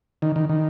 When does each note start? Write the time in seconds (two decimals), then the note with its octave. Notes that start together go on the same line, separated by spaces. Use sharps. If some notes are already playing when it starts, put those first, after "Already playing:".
0.22 D#3
0.36 D#3
0.49 D#3